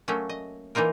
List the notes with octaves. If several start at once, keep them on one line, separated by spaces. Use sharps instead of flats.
F#3 A3 A#3 C#4
D#5
E3 A#3 D#4 F4 A#4